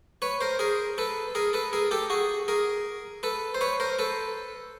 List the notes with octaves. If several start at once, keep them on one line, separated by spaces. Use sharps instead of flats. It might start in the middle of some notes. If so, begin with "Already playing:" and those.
B4 C#5
A#4 C5
G#4 A#4
A4 B4
G#4 A#4
A4 B4
G#4 A#4
G4 A4
F#4 G#4
G#4 A#4
A4 B4
C5
B4 C#5
A#4 C5
A4 B4